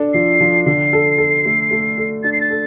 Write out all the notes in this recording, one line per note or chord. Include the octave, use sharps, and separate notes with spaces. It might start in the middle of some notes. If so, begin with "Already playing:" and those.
Already playing: D4 A4
F3 C7
F3
D3 C7
A4
A4
A3
A3
A4
D4 A6
C7
A6
A4